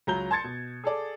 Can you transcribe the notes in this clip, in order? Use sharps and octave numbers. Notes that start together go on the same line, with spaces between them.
C#2 F#3 A#5 G6 G7
A5 C6 G#6 A6 C#7
B2
G#4 A4 D5